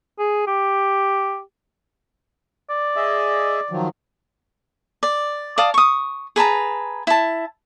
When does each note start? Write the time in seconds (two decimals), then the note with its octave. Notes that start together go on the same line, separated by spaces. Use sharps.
0.19 G#4
0.47 G4
2.70 D5
2.96 G#4 D#5 E5
3.70 D#3 F3 F#3
5.03 D5
5.58 D5 F5 A5 D#6
5.74 C#6 D#6
6.36 G#4 B4 A5 A#5
7.07 E4 A5